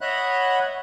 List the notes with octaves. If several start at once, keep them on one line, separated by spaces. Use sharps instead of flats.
C#5 D#5 E5 F#5 B5 F#6